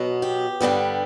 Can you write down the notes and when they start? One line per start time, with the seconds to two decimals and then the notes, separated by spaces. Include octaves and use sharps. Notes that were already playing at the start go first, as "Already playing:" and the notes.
Already playing: B2 F#3 B3
0.22 G4
0.61 G2 D3 G3 B3